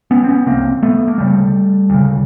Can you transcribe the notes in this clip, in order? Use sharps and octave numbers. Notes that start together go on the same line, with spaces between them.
B3 C#4
C4
B3 C#4
C2 C3 A#3 C4
A3 B3
A#3
D2 C#3 G3 A3
D2 C#3